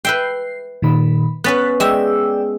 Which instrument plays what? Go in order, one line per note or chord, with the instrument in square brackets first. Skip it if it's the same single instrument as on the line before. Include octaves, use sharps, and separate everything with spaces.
[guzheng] B4 E5 G5 [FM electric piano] C7
[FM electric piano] A#2 D#3 B5
[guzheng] B3 C#4 B4 [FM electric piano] F#6 A6 B6
[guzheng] G#3 E5 [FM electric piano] D5 G5 E6